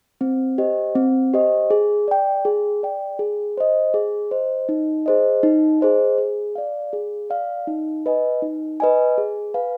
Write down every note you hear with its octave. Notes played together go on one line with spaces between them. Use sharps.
C4
G4 C5 D#5
C4
G4 C5 D#5
G#4
D5 G5
G#4
D5 G5
G#4
C5 D#5
G#4
C5 D#5
D#4
G#4 C5 D#5
D#4
G#4 C5 D#5
G#4
D5 F5
G#4
D5 F5
D#4
B4 D#5 G#5
D#4
B4 D#5 G#5
G#4
B4 F5 G#5